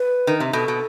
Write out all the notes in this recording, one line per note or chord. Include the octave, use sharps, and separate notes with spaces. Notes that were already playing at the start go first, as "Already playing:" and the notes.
Already playing: B4
D#3
C3
B2 A4
B2